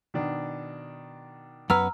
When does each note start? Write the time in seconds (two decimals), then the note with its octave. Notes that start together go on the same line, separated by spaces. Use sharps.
0.14 B2 D#3 D4
1.70 F#2 B3 B4 A#5 E6 F6